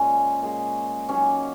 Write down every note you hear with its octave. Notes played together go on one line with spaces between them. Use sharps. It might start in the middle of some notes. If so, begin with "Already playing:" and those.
Already playing: A#2 G#3 C#4
A#2 G#3
D#3 F#3 A#3 C#4